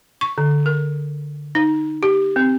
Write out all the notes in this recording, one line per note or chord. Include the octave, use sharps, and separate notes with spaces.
C#6
D3
A#4
D#4
G4
C4